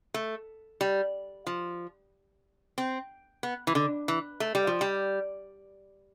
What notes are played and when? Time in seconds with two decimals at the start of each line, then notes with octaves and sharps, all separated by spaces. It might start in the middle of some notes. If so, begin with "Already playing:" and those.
0.14 A3
0.81 G3
1.47 F3
2.78 C4
3.43 B3
3.67 E3
3.75 D3
4.08 E3
4.40 A3
4.55 G3
4.67 F3
4.81 G3